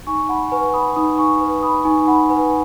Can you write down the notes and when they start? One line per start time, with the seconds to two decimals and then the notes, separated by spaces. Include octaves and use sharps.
0.07 D#4 G#5 C#6
0.29 F#5 B5
0.52 B4 G#5 C#6
0.74 B5 D#6
0.96 D#4 B5 D#6
1.18 G#5 C#6
1.41 B4
1.63 B5 D#6
1.85 D#4 G#5 C#6
2.07 F#5 B5
2.30 B4 G#5